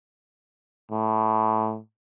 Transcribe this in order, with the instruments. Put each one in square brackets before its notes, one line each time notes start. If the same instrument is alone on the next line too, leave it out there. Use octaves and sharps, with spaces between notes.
[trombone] A2